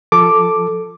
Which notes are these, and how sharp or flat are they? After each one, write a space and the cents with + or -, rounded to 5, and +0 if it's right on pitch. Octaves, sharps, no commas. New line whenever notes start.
F3 +0 A4 +0 D6 +0